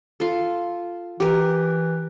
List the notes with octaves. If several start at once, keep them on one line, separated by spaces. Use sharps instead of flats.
F4 A4
E3 G4 A#4